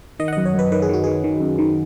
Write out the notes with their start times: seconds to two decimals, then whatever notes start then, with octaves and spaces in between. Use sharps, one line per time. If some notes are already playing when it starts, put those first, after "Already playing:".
0.20 D#3 D#5
0.28 F#5
0.33 D#5
0.37 F#2
0.45 C#5
0.54 F#2 B4
0.72 D#3 B4
0.82 G#4
0.89 D#3 F#4
1.04 D#3 G#4
1.24 D#3
1.40 F#2
1.58 D#3